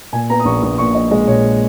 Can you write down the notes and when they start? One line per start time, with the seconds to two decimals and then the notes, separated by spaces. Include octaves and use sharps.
0.13 A#2 G#5
0.30 B3 A#5
0.40 D#6
0.45 A#1 C#6
0.63 A#1 D#6
0.78 A#2 C#6
0.95 A#1 D#5
1.11 G#3 D#5
1.28 A#2 C#5